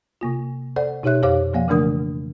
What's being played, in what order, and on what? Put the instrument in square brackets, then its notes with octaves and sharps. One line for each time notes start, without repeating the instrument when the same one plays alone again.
[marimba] C3 A#3 F4
A4 C5 D5 F#5
B2 D#4 G4 C#5 E5 F#6
F2 G4 C5 C#5 F5 D6
B2 F3 A#3 F5 F#5
C#3 E3 A3 D4 A#4 D#6